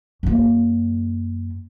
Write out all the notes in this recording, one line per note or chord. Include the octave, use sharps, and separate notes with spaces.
F#2 A#3